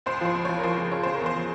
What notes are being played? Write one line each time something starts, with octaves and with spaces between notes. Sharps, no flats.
C#2 C5
F3 C5
C#2
F3 C#5
A#4
F3 C5
C#3
C#3 C#5
C#3 C5
A#4
E2
C5
F3